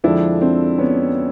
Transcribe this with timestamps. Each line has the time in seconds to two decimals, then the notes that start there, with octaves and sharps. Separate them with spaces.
0.04 F2 D3 F3 G#3 D4 E4
0.41 C4 D4
0.78 B3 C#4